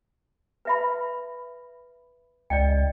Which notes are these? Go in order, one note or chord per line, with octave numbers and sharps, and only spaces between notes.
B4 E5 B5
C#2 D5 D#5 G5